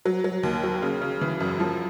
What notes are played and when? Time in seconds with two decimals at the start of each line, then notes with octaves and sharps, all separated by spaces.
0.05 F#3
0.24 F#3
0.43 D#2
0.63 F#3
0.82 C#3
1.01 C#3
1.21 E3
1.40 F#2
1.60 F3